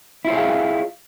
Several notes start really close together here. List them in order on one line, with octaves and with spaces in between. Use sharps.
E4 F4 C#5 G#4 F5